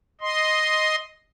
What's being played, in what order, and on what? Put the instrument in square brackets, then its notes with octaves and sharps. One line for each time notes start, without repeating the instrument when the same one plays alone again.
[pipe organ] D#5 C6